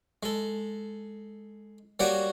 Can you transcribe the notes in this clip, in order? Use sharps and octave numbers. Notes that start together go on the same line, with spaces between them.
G#3 A4
G3 A#3 F#4 C#5 F#5 G5